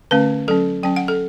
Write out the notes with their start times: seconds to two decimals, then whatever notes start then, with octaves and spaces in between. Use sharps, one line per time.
0.11 D3 A3 C#4 B4
0.48 F#3 C#4 A4
0.83 F#3 C#4 G5
0.96 F#5
1.08 A4